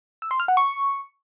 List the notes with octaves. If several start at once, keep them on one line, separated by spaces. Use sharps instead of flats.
E6
C6
F6
F#5
C#6